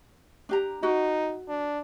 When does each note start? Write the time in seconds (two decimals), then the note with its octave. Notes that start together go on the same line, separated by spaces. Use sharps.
0.49 D4 G4 A#5
0.83 D#4 F#4
1.48 D4